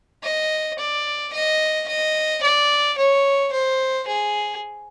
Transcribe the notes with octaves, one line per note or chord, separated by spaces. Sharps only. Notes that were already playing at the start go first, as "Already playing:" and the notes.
D#5
D5
D#5
D#5
D5
C#5
C5
G#4